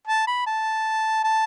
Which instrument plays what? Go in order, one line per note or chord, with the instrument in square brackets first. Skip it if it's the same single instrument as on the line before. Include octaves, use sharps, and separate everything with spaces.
[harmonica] A5
B5
A5
A5